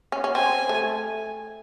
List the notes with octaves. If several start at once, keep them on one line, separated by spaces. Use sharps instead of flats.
C#4
C#4
C4 G#5
A3